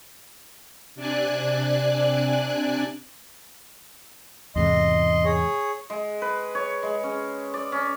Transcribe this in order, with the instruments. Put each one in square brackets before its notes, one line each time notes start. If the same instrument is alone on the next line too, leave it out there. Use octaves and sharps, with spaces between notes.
[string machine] C3 D4 D5 G#5 F#6
[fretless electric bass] E2 G#2 C3 [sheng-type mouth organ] D#5 C6
[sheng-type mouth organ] G#4 C#5
[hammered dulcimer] G#3
B4
C#5
G#3
C#4
D5
C#4